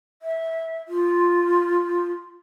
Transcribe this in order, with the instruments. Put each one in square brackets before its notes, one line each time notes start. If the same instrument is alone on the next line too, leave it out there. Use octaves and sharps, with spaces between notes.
[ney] E5
F4